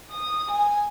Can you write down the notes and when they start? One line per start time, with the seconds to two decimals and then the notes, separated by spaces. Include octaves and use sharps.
0.11 D#6
0.52 G#5